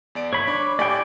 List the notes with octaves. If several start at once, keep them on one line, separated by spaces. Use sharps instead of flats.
E2 D5 D7
G1 C#5 B5
D4 D6
A2 G4 D5 G5 G#5